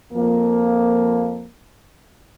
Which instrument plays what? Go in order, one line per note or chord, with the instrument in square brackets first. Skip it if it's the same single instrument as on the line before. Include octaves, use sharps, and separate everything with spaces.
[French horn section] F2 F3 A#3